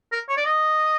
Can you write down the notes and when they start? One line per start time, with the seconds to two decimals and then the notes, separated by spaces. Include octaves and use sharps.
0.12 A#4
0.29 C#5
0.37 D5
0.46 D#5